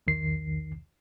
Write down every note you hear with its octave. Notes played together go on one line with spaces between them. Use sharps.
B1 E2 D#3 C7